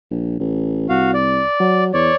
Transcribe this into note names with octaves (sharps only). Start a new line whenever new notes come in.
A#1
A1
C2 F#4 F5
D5
F#3
E2 C#5 D5